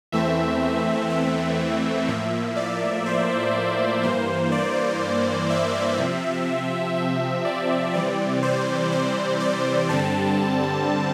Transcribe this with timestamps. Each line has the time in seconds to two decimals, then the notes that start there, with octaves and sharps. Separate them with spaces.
0.12 E2 E3 A3 C4 E5
1.10 E5
2.08 A2 F3 A#3 E5
2.56 D5
3.06 C5
4.03 G2 E3 A#3 C5
4.52 D5
5.50 E5
5.98 C3 F3 C4
6.96 E5
7.45 D5
7.94 C3 E3 G3 C4 D5
8.43 C5
8.92 C5
9.40 D5
9.89 G2 D3 G3 C4 A5